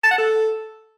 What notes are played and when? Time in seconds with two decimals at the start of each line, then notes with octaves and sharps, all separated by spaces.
0.04 A5
0.11 F#5
0.18 A4